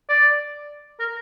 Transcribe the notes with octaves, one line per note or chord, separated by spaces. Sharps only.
D5
A#4